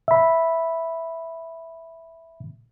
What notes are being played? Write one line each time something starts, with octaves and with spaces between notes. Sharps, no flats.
E5 B5